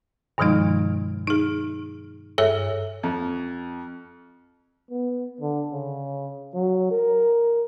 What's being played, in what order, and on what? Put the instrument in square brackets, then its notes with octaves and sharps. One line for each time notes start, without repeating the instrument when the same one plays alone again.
[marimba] G2 B2 D#3 F3 G#3 D#4
D#4 G#4
G2 G#4 A4 C#5 E5 E6
[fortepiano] F2
[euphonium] B3
D3
C#3
F#3
A#4